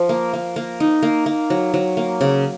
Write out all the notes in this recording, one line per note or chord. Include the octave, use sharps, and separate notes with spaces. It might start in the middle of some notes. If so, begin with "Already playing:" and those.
Already playing: F3
A#3
A#3
A#3
D#4
A#3
A#3
F#3
F#3
A#3
C#3